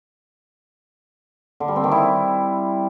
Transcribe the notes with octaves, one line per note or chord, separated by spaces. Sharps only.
D3
G3
C4
D#3
E4